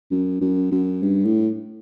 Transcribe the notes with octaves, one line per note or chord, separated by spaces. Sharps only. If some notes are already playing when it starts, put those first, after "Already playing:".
F#2
F#2
F#2
G2
A2